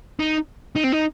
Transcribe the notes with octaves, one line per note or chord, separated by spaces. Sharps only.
D#4
D#4
C4
D#4